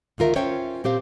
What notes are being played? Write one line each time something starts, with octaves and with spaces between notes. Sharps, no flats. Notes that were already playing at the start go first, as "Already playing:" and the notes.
D2 D#3 F4 A#4 E5
C#4 F4 C5 C#5 E5 G5
A#2 C4 G4 C5 F5